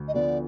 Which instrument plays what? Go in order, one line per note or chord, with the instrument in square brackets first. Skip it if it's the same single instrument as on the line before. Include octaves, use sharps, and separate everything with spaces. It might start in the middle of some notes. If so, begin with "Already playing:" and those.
Already playing: [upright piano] D2
[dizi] D#5
[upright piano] D3 F3 B3 [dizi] D5